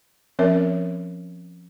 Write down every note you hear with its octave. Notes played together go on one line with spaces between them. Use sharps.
F3 C4 C#4 A#4 C#5 E5